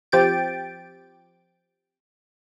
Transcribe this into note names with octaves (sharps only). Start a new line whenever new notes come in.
F3 C4 G4 G5 A6 D7